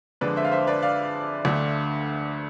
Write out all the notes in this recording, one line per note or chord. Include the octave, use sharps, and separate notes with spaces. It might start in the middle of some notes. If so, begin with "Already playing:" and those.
F2 D3 G#3 B4 D5
C5 E5
F5
C5 E5
B4 D5
D5 F5
D2 D3 A3